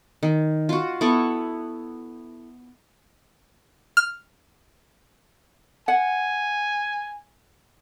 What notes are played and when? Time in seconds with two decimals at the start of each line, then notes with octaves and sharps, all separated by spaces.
0.23 D#3
0.69 F4 F#4
1.01 B3 E4 A4 C#6
3.97 F6
5.88 F#5 G#5